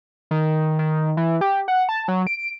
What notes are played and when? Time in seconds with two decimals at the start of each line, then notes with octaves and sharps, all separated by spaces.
0.31 D#3
0.79 D#3
1.17 E3
1.41 G4
1.68 F#5
1.89 A5
2.08 F#3
2.27 D7